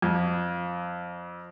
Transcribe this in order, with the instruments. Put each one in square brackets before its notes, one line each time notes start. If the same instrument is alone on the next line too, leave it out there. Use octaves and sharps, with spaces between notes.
[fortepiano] F2